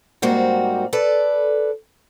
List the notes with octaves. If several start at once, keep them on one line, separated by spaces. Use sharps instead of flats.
G#2 G3 A#3 C4 F#4
A4 B4 D5